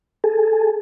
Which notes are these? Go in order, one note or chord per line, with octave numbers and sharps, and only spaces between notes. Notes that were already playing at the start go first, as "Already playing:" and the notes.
G#4 A4